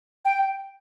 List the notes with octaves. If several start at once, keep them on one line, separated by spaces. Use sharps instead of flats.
G5